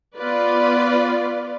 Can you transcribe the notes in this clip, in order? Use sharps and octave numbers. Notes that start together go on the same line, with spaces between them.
B3 F4 B4 D5